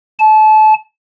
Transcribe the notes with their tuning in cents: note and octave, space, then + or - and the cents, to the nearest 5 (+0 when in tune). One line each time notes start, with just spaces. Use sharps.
A5 -30